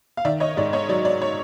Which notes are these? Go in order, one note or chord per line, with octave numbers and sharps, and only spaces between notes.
F5
D#3 D5 E5
C#5 D#5
G#2 D5
C#5 D#5
F#3 D5
D5
C#5